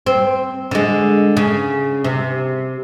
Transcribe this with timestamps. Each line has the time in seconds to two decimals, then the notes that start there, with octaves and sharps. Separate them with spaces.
0.06 C4
0.71 D3 G#3
1.37 C#3
2.04 C3